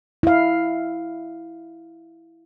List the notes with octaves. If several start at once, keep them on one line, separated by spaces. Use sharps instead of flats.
E4 F5